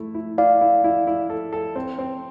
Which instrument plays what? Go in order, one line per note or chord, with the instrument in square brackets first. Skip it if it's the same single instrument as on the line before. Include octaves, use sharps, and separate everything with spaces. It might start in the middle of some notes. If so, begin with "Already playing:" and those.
Already playing: [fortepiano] A3 E4
E4
[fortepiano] E4 [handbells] D5 F5
[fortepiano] E4
E4
E4
A4
A4
C4
C4